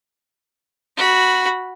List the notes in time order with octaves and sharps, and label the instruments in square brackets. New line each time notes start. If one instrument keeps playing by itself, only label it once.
[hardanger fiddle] F#4 B5